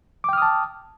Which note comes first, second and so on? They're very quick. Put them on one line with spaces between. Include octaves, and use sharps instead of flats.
D6 G5 F6 D#6 A5